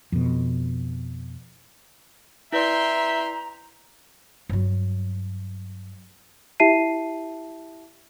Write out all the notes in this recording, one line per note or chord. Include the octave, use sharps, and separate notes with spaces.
F2 B2
E4 B4 D5 E5 G5 A#5 C6
G2 F#3
E4 G4 E5 A5 C7 D#7